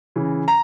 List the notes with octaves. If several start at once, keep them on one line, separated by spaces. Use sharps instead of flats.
C#3 E3
A#5